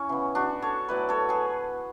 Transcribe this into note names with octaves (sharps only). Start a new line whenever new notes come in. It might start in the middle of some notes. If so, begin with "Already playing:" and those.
Already playing: C#4 E4
C#3 E3 B3
D4 F#4
A4 C#5
A2 F#3 B3 B4 D5
A4 C#5
G#4 B4